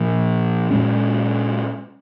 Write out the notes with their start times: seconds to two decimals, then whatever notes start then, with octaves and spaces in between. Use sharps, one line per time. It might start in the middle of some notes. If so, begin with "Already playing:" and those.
Already playing: A#2 F3 A#3
0.71 A#2 G#3 C#4